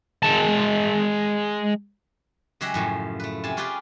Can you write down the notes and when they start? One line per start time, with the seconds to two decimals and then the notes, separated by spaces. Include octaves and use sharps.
0.23 G#3 A5
2.61 C#3 F#3 G#3 G4 E5 F#5
2.74 F#2 A2 F3
3.20 A3 B4
3.44 C3 C4 G#5 A5
3.57 C#4 F4 G4 G#4 B4 D5